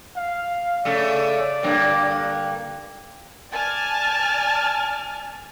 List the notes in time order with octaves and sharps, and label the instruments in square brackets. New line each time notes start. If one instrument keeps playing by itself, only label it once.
[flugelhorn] F5
[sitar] C#3 A3 [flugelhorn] D5
[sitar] G2 D3 A#3
[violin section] D5 G#5 A5 F6